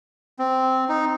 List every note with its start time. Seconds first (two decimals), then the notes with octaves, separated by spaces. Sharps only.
0.39 C4
0.89 D#4